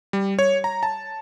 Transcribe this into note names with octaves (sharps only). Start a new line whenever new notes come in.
G3
C#5
A#5
A5